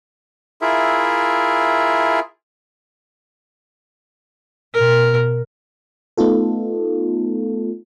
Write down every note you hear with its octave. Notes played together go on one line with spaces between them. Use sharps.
E4 F4 G#4 A#4 E5
B2 A#4
A3 B3 D#4 F4 A4